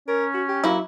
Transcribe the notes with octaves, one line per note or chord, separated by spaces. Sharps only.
C#4 A#4
F#4
G4
F#3 A#3 E4